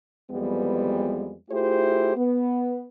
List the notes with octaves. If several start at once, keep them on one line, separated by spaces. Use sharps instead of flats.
F2 E3 G3 G#3 B3
A3 E4 F4 G4 G#4 C5
B3